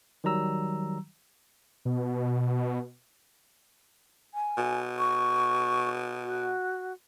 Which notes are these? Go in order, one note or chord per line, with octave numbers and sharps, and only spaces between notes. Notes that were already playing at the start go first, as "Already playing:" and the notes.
D#3 F#3 G3 A#5 E6
B2
G#5
B2
C#6
F#4